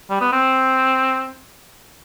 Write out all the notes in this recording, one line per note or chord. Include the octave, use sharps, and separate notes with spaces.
G3
B3
C4